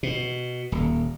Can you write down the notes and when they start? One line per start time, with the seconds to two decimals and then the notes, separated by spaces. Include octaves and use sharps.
0.03 B2
0.72 D#1